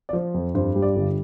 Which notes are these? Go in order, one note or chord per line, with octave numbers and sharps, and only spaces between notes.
D5
F3 C5
F2
G2 C5
G3
D5
G1